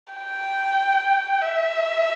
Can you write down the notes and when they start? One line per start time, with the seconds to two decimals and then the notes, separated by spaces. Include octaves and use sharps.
0.14 G5
1.41 E5